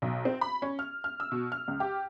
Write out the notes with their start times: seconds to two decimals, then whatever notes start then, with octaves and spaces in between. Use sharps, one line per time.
0.02 B1
0.25 C4
0.41 B5
0.62 C#4
0.79 F6
1.04 F6
1.20 E6
1.32 B2
1.52 F6
1.68 C#2
1.80 G4